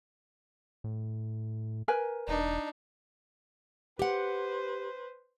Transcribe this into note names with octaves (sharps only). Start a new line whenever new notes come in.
A2
A#4 B4 G#5
E1 D4 D#4
G4 B4 C5 F#5